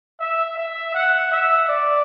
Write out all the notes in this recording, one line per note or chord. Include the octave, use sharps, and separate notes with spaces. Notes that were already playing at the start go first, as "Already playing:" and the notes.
E5
E5
F#5
E5
D5